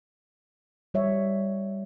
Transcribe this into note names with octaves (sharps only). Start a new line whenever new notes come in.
G3 C#5 E5